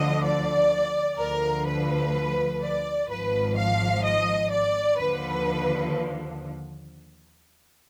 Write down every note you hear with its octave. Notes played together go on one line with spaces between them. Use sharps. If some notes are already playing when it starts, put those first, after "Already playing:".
Already playing: D2 D3 F3 D#5
D5
D2 D3 F3 A#4
B4
D5
G#1 G#2 F3 B4
F5
D#5
D5
D#2 D3 F3 B4